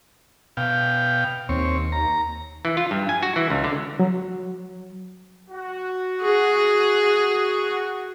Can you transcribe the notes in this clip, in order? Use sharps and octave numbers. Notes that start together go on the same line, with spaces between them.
B2 F5 G5
D#2 C4 C#5
A#5
E3
F4
G2
G#5
F#4
E3
C#2
D3
F#3
F#4
G#4